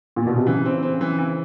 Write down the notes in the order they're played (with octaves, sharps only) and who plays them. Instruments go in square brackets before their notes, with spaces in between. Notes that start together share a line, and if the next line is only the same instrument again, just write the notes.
[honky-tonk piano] A#2
B2
C3
[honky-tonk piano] C#3 [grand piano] E3
[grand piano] C4
C4
E3
E3